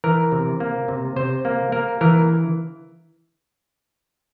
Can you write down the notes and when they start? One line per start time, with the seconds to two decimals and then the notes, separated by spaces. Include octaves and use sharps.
0.04 E3 A#4
0.32 C3
0.60 A#3
0.88 C3
1.16 C3 C5
1.45 A#3
1.72 A#3 A#4
2.01 E3 A#4